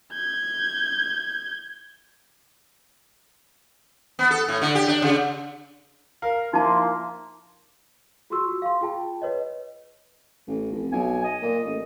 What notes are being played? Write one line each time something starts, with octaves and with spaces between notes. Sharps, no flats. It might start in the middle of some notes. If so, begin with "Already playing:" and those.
G6 G#6
B3
A4
A2
D3
G4
D4
C#3
A#4 F5
F3 A#3 D#4 E4 A5 C6
F4 F#4 G#4 C6 C#6 E6
F#4
F5 C6
F4 G#4 G5 A5
B4 C#5 D#5
A1
F1
B1 G#5
D#5
A#2
A1